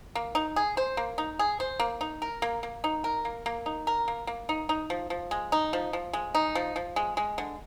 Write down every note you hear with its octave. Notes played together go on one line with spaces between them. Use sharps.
A#3
D#4
G#4
C5
A#3
D#4
G#4
C5
A#3
D#4
A#4
A#3
A#3
D#4
A#4
A#3
A#3
D#4
A#4
A#3
A#3
D#4
D#4
F3
F3
G#3
D#4
F3
F3
G#3
D#4
F3
F3
G#3
G#3
D3